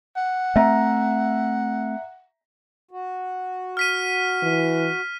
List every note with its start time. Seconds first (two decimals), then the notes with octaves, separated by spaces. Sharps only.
0.17 F#5
0.56 A3 C4 E5 A#5
2.91 F#4
3.77 F6 B6 D#7
4.43 E3